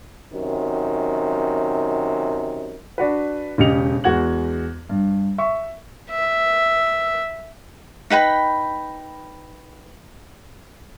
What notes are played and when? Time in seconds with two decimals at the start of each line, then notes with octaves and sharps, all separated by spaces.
0.32 F#2 C3 D#3
2.98 D4 F#4 B4
3.58 E1 C#3 G4 D#5 C#7 F7
4.04 E2 G#3 F#4 G#6 F#7
4.89 G2
5.38 E5 C#6
6.10 E5
8.10 D#4 B4 G5 B5